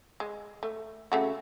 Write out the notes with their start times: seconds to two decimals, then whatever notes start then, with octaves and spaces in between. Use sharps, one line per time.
0.20 G#3
0.63 A3
1.12 C#3 A3 F#4